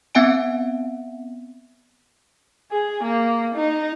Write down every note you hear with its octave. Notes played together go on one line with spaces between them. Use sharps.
B3 C4 E5 F#5 G#5 D7
G#4
A#3
D#4